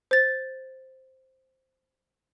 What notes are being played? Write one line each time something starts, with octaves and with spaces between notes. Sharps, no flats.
C5 A6